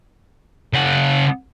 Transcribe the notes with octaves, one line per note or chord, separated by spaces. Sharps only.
C#3 F#5